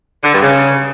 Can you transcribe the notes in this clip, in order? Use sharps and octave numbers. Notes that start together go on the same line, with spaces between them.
D3
G2
C#3